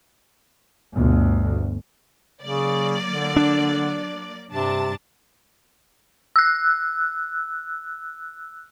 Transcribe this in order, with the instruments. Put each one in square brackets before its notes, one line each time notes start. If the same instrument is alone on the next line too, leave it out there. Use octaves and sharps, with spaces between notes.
[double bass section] G1 D2 B2
[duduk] C#3 [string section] F#3 A#3 D5
[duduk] D3
[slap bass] D4
[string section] G2 D4 A5 [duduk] C3
[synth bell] E6 F#6